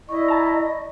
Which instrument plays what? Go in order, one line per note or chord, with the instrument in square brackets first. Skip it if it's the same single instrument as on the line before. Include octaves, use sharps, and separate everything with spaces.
[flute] E4 [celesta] D5 C#6 [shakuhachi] D#5
[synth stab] A5 A#5